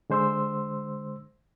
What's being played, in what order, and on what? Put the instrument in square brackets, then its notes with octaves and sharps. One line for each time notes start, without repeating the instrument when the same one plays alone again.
[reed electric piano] D3 G#3 C5 C6 E6